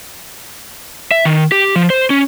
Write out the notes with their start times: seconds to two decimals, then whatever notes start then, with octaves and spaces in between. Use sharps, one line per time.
1.11 E5
1.25 D#3
1.52 G4
1.76 F3
1.90 C5
2.10 C#4